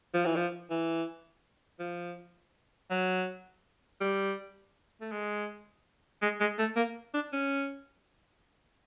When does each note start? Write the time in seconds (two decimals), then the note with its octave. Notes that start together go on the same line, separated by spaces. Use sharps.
0.14 F3
0.25 E3
0.36 F3
0.70 E3
1.79 F3
2.90 F#3
4.01 G3
5.01 A3
5.11 G#3
6.22 G#3
6.40 G#3
6.58 A3
6.76 A#3
7.14 D4
7.33 C#4